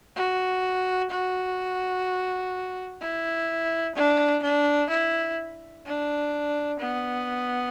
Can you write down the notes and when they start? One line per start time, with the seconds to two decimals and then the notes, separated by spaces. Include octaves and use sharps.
0.16 F#4
1.10 F#4
3.01 E4
3.95 D4
4.43 D4
4.90 E4
5.86 D4
6.80 B3